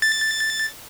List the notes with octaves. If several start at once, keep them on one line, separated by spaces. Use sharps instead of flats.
A6